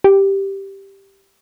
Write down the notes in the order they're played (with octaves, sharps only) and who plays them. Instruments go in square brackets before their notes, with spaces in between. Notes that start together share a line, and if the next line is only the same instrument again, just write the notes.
[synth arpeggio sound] G4